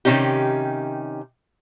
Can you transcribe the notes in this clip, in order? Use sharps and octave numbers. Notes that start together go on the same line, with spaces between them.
C3 D#3 C#4 D#4 G4